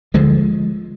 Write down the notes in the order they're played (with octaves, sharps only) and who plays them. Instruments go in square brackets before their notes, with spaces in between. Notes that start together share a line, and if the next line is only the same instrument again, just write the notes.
[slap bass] D2 D3 F3 G#3